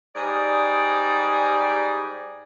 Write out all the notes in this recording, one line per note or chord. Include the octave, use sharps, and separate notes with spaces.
G#2 G3 G#4 D5